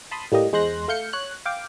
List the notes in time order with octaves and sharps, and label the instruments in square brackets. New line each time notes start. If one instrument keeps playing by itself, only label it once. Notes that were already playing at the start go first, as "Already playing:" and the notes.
[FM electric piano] A5 B5 C6 D#6
A2 G3 A#3 G4 D#5
E2 G#3 C5 C6 F#6 A#6
A3 F5 G6 C#7
C#5 F#6
F5 G5 D6